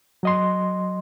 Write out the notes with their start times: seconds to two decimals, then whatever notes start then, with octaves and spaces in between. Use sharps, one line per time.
0.23 F#3 D#5 C6